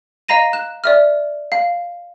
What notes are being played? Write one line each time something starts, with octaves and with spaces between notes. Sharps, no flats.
D#5 F5 A#5 A#6 D#7
F#6 E7
D5 E5 F6
F5